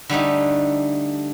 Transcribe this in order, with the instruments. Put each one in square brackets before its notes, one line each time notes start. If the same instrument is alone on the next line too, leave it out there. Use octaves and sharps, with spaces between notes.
[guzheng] D3 G3 A3 D#4